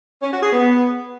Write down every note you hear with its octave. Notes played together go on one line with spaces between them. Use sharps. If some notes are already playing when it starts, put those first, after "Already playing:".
C#4
F#4
G#4
B3